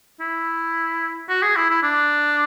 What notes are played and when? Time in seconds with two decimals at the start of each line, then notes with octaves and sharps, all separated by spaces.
0.20 E4
1.29 F#4
1.42 G#4
1.56 E4
1.70 E4
1.83 D4